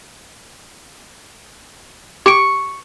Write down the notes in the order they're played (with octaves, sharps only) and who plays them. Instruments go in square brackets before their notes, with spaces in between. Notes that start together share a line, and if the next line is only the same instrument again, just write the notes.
[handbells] G4 D7 [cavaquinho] C#6